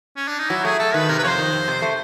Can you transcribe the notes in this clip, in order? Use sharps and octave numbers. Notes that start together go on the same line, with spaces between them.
C#4
D4
D#4
F#3 E4
A3 G#4
A3 A4
D#3 B4
C3 A#4
B4
F2 C5 C#5
D#3
F2
C3
A3